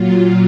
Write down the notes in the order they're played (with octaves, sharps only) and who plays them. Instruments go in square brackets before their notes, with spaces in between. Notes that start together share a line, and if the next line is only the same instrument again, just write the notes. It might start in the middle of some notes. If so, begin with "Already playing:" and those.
Already playing: [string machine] A#2 F#3 F4